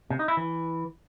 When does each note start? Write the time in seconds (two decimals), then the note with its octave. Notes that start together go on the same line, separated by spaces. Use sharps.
0.10 C3
0.19 D#4
0.28 E4
0.37 E3